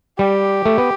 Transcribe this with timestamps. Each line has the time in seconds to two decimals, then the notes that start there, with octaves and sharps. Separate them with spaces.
0.19 G3 G4
0.66 A3
0.78 B3